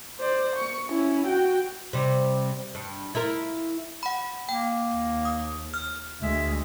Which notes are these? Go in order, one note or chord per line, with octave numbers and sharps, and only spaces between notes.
C5 D5
C#6
C#4 E4
F#4 G5
C3 G3
G2
E4 F4 A#4
F#5 B5
A#3 G5
D#2
D#6
F6
D2 G#3 E5